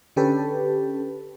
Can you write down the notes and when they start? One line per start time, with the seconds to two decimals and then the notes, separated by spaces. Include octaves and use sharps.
0.16 D3 C#4 G4 A4 B4